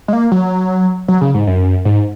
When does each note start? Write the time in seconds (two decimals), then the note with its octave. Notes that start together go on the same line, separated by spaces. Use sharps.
0.08 G#3
0.13 A#3
0.32 F#3
1.08 F#3
1.21 C#3
1.34 G#2
1.47 F#2
1.85 G#2